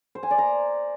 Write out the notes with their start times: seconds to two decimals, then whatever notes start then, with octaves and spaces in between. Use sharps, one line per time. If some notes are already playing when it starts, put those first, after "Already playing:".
0.15 C5
0.23 G#5
0.31 D5
0.38 A#5